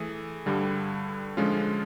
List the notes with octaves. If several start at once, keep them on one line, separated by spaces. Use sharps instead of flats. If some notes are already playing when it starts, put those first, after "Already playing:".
Already playing: E3 A3 G#4
G2 D3 G3
D3 F3 G#3 C#4 F4